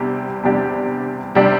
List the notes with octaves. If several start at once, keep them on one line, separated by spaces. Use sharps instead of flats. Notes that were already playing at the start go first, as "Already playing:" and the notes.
Already playing: E2 C3 G3 D4 G4
E2 C3 G3 D4 G4
C3 G3 D4 G4